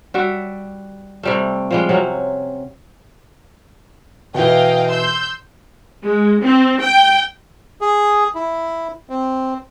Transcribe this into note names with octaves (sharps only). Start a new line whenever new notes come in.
G3 F#4 E5
C3 G3 A3
F3 G3 G#3
C3 F#3 C#4
B2 E3 D#5 F5 G5
C6 E6 G6
G#3
C4
G5
G#4
E4
C4